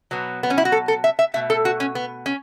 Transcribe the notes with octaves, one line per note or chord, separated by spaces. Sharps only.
B2 F#3 B3
B3
C#4
E4
F#4
A4
A4
E5
E5
B2 A3 E5
A4
F#4
C#4
B3
C#4